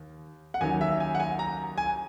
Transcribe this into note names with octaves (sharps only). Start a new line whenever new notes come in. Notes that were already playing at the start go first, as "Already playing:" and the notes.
Already playing: D#2
F#5
D#2 D#3 F#3 C#4 G#5
E5
G#5
F#5
G#5
A#5
G#5